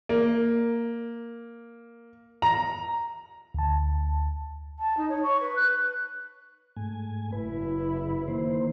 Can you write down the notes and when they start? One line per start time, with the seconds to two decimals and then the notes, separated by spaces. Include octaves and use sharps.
0.09 A#3
2.42 A#5
3.54 D2 A5
4.79 A5
4.97 D#4
5.09 C#5
5.23 C#6
5.41 B4
5.56 F#6
6.76 G#2 A3 G#5
7.32 F#1 E4 B4
8.28 D#3 A#3 C5